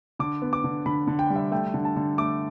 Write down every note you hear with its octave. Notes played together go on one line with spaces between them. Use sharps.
D3 D6
B3
D6
D3
D3 B5
D3
G5
G3
E5
A3 G5
D3
A5
D3
A3 D6